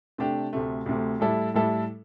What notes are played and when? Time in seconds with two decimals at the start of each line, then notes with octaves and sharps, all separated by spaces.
0.18 C3 A3 D4 G4
0.53 D2 C3 A3
0.86 D2 C3 A3
1.20 A2 G3 E4 A4
1.54 A2 G3 E4 A4